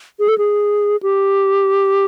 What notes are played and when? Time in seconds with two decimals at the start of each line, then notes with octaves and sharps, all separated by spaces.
0.19 G#4
0.28 A4
0.38 G#4
1.03 G4